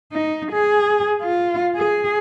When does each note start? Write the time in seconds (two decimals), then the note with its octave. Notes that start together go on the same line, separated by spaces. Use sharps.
0.12 D#4
0.51 G#4
1.22 F4
1.75 G#4